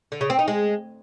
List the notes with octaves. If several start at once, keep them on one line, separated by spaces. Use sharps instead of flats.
D3
C#3
C4
D#4
G#3